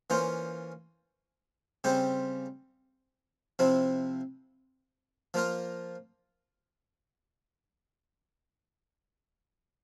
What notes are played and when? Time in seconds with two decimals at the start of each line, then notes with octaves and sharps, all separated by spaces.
0.10 E3 A#3 C#4 F4 C5
1.84 C#3 G3 C4 G4 C5
3.59 C3 F3 C4 E4
5.34 F3 A#3 F4 A#4